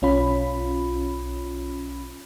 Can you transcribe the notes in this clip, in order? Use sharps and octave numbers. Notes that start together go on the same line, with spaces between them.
B1 C#4 F4 B5